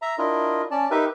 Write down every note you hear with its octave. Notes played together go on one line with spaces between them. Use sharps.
E5 A#5
D4 E4 F4 A#4 D#5
C#4 D5 A5
D#4 G4 A#4 B4 E5